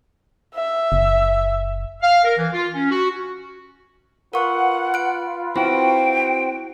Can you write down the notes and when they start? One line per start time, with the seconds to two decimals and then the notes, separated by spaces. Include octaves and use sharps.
0.55 E5
0.92 F#1
2.03 F5
2.24 A#4
2.37 E3
2.53 F4
2.74 C#4
2.91 F#4
4.33 F4 A#4 B4 F#5 C#6
4.94 F#6 D7
5.56 C4 E4 F#4 G5